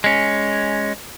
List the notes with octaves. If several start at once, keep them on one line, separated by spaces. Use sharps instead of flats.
G#3 C#4